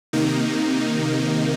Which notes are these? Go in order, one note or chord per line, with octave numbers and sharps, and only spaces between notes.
C3 D#3 A#3 D#4